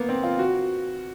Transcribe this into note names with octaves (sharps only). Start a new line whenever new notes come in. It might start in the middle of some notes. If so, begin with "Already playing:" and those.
Already playing: A#3 B3
C4
F4
F#4